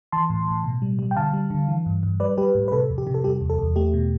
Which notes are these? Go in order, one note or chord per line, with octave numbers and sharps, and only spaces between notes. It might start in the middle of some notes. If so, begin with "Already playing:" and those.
E3 A5 C6
A2
A2
B2
G3
G3
G5
D3 F5 A5
G3
D3
E3
G2
G2
G3 B4 D5
G3 G4 B4
A2
B4
C3 A4
F2
G4
C3
A4
G3 G4
E2
A4
E2
A3 G4
B2